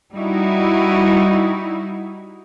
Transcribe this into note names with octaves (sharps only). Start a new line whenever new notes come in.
G3 D#4 E4 F#4